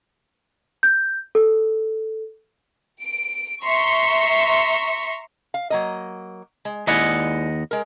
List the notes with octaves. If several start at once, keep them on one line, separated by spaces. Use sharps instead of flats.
G6
A4
D7
E5 A#5 C6 C#6
F5
F#3 A#3 D#5
G#3
D#2 G#3 E4 D5 D#5 F#5
G#3 A#4